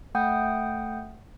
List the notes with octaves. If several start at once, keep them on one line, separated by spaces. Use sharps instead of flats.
A3 F#5 G5 D#6 G6